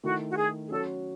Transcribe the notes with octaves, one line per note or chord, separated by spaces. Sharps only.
D#3 A3 E4 F#4
F#4
G#4
G#4
F#3 C#4 F#4 A4 C#5